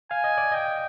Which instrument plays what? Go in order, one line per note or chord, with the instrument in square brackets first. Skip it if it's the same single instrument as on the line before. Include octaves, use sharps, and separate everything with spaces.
[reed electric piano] F5 [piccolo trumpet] G#5
[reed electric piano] D#5
D5
[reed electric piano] D#5 [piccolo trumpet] G5